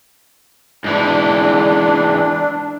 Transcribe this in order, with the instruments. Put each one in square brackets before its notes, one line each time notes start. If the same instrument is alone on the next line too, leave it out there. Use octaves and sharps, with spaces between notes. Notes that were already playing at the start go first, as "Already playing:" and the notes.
[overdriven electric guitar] G#2 E3 [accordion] D4